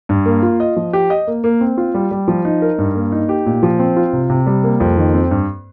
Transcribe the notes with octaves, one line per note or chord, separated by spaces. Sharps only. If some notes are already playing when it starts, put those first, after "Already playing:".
G2
A#3
F4
D#5
F3
G4
D#5
A#3
A#3
C4
F4
G3
G3
F3
D#4
A#4
G2
A#3
D#4
G4
A#2
F3
C4
F4
C3
C3
G3
A#3
F2
D#3
C4
G2